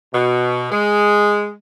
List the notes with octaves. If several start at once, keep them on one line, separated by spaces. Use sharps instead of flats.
B2
G#3